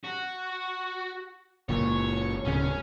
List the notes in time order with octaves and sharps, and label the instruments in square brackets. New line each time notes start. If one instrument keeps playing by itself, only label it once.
[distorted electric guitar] F#4
[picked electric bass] F#1 A#2 [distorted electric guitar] C#5
[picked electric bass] D1 C#3 [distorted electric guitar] C#4